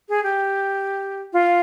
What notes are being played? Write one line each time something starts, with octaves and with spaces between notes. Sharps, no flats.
G#4
G4
F4